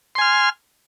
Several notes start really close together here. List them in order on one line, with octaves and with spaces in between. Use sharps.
C6 G#5 F6